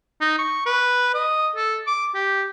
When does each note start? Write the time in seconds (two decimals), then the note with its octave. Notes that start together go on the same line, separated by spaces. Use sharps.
0.20 D#4
0.38 C#6
0.65 B4
1.14 D#5
1.56 A4
1.87 D6
2.15 G4